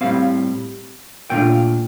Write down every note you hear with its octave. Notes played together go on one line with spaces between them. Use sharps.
A2 G3 C4 F5
A#2 A3 D4 F4 G5